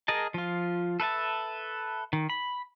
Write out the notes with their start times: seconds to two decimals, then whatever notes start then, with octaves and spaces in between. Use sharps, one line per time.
0.08 G#4 A#4 D#5 A5
0.34 F3 F4
1.00 A4 B4 E5 A5
2.13 D#3
2.30 B5